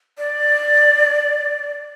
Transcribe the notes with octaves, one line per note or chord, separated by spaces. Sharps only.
D5